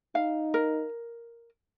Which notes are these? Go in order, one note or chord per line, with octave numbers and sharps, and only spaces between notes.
D#4 F5
A#4